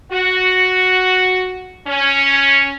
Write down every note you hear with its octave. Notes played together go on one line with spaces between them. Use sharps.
F#4
C#4